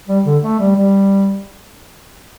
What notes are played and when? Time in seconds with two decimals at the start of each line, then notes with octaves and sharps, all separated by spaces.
0.08 G3
0.26 D3
0.43 A3
0.59 G3
0.75 G3